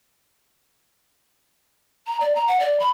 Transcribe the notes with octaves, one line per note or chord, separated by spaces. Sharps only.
A#5
D5
A#5
F#5
D5
B5